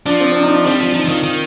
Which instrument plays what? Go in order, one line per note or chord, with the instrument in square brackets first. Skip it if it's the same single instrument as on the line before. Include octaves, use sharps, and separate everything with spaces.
[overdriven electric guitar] F3 [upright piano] D4
[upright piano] C4
C4
D4
D#4
D4
[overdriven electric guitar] G3 [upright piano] C4
[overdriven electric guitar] F3 [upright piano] D4
[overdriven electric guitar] F3 [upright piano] D#4
[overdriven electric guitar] F3
[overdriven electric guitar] D#3 [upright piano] F4
[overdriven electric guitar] D#3